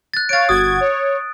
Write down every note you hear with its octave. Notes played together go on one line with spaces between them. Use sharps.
F#6 A6
C#5 F5 A6 D7
G1 F#4 D#6 G#6
C#5